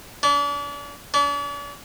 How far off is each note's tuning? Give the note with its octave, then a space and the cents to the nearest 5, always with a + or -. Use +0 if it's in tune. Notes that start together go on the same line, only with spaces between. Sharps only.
D4 -40
D4 -45